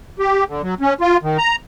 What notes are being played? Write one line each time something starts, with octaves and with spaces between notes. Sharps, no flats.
G4
D3
F#3
C#4
F4
D#3
A#5